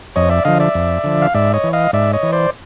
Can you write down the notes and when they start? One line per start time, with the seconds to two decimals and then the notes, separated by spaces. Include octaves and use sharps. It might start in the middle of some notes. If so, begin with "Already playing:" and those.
0.16 F2 C#5 D#5
0.30 D5 E5
0.45 D3 F3 D#5 F5
0.60 D5 E5
0.74 F2
1.04 D3 F3
1.22 F5
1.34 G#2 D5 E5
1.54 C#5 D#5
1.64 E3
1.73 D#5 F5
1.93 G#2 D5 E5
2.13 C#5 D#5
2.23 E3
2.32 C5 D5